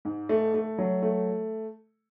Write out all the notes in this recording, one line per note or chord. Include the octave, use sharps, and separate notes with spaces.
G#2
A3
A3
F#3
A3